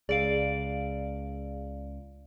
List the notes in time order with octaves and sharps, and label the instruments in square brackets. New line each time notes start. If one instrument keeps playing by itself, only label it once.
[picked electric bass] C#2 [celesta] G#4 D7 [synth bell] D5 F5